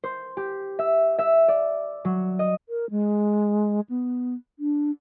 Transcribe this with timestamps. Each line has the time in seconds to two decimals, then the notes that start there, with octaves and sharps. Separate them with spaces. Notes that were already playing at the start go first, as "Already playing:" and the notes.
0.04 C5
0.37 G4
0.79 E5
1.19 E5
1.48 D5
2.05 F#3
2.39 D#5
2.69 A#4
2.90 G#3
3.89 B3
4.59 D4